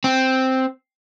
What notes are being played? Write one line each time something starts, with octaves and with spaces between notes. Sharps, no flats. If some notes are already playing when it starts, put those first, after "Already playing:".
C4